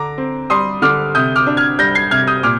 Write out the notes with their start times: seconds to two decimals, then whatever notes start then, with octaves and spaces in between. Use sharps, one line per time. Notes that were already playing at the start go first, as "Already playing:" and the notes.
Already playing: D3 A#5 D6
0.18 C4
0.50 G3 C6 D#6
0.82 D3 D6 F6
1.15 C3 D#6 G6
1.36 D6 F6
1.47 D4
1.57 F6 G#6
1.79 G3 G6 A#6
1.95 G#6 C7
2.11 C3 F6 G#6
2.27 D#6 G6
2.43 A#2 D6 F6